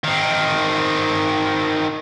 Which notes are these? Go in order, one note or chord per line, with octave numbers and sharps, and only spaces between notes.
D#3 C4